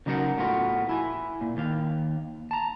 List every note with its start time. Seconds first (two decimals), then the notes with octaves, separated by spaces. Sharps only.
0.06 C#3 F#3 D#4 A#4 F#5
0.38 A2 B3 F4 F#4
0.89 E4 G#5
1.41 A#2
1.57 D#2 F5
2.51 A5 A#5